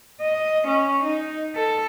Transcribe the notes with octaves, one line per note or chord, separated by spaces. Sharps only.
D#5
C#4
D#4
A4